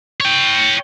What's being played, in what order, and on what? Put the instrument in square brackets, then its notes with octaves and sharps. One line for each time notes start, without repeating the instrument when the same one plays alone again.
[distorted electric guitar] C#5 G5